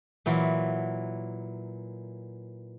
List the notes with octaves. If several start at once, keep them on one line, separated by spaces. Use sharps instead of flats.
A#2 E3 F#3